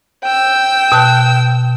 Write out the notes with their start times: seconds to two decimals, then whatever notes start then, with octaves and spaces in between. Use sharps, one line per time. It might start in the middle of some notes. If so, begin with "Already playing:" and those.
0.23 G5 E6
0.92 B2 A5 F#6